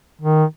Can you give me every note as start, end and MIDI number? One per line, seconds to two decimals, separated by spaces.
0.22 0.45 51